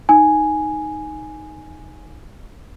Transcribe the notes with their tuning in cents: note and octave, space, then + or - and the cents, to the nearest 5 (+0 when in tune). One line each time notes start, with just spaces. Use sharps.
D#4 +0 G#5 +0